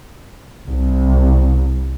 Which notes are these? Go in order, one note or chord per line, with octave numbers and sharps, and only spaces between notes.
C2